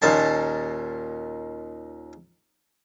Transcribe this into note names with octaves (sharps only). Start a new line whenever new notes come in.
D#2 A#2 C#4 A5